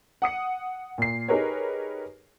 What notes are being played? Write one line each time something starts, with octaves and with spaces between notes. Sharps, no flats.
F#5 D#6 C#7
A#2 C7
D#4 G4 G#4 A#4 B4 C#5